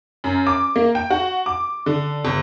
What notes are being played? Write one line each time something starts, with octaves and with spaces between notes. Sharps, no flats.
F#2
D6
A#3
G5
F#4
D6
D3
G1